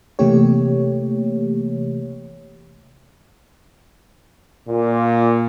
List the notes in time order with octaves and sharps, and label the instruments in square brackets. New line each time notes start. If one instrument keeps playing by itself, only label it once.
[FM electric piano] C3 E3 A3 A#3 G4 C#5
[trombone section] A#2